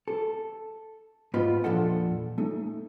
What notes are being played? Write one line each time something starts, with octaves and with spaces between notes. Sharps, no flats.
A4
G#2 B3 F4 D#5 B5
E2 A#2 F3 D4 A4 F#5
A3 D#4